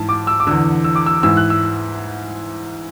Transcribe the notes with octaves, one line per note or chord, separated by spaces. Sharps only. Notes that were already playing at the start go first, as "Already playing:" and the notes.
Already playing: G#2 E3 A5
D6
E6
D6
E2 D3 E6
E6
D6
E6
G#2 E3 E6
F#6
E6